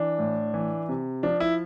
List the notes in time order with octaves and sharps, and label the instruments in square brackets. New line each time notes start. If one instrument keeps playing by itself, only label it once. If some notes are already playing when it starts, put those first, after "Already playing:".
Already playing: [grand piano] E3 D4
A2
E3
C3
F3 D4
E4